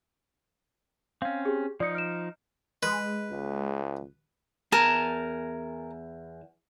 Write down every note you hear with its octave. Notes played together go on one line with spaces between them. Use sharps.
C4 C#4 F5
G4 G#4
F3 D#4 D5 D#6 C#7
F6 D7 E7
G#3 B4
C#2
E2 A#4 G#5 A5